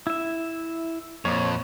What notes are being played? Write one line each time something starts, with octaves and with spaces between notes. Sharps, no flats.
E4 E5
F2 A#2 A#3 C#5